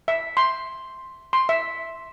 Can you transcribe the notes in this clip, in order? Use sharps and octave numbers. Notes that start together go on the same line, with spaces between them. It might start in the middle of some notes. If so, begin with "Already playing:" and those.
E5
C6
C6
E5